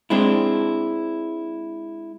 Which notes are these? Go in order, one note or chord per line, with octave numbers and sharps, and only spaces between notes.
G#3 C4 D4 E4